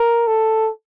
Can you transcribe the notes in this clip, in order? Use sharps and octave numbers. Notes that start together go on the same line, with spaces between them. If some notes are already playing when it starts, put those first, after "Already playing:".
Already playing: A#4
A4